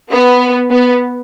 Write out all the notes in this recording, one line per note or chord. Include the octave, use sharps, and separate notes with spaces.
B3
B3